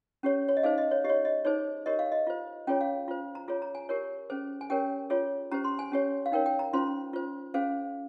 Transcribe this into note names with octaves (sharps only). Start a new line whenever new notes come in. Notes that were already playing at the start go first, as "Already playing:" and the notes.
C#4 G4 C#5
C#5
D#5
D#4 G#4 C5 F5
D#5
C#5
G4 C#5 D#5
D#5
D#4 G#4 C5 C#5
G4 A#4 C#5 D#5
F5
D#5
F4 C5
C#4 F4 G#4 C#5 G5
F5
F4 C5
A#5
F4 G#4 C#5
A#5
G#5
G4 A#4 C#5
C#4 G#4 C5
G#5
C#4 G4 A#4 C#5 G5
F4 G#4 C#5
C#4 G4 C5 A#5
C6
G#5
C#4 G4 C#5
F5
D#4 A#4 C#5 G5
G5
A#5
C#4 F4 C5 C6
F4 C5
C#4 G#4 C5 F5